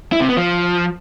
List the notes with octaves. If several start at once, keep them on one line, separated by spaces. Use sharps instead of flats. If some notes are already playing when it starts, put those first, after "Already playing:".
E4
C3
B3
F3